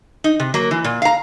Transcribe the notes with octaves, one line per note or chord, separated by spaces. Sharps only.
D#4
C3
F#3 A#3 A#4
E3
A#2
F5 A#5